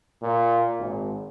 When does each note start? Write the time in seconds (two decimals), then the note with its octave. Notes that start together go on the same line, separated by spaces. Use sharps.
0.22 A#2
0.79 G#1